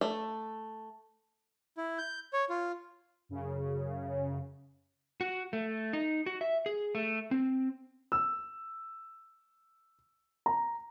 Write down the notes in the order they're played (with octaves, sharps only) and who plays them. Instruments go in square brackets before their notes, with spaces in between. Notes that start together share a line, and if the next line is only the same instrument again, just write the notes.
[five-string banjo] A3
[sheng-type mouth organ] E4
G6
C#5
F4
[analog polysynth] F#2 C#3
[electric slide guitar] F#4
A3
D#4
F#4
E5
G#4
A3
C4
[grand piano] E6
A#5